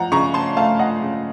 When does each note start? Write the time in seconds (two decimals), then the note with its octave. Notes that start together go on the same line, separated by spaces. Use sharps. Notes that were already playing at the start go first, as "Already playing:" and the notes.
Already playing: F3 F#5 A#5
0.12 C#3 A#5 C#6
0.34 A5 C6
0.56 A3 F5 A5
0.79 D#5 F#5
1.02 C#3